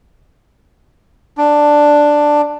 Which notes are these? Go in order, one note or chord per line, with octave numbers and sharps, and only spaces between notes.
D4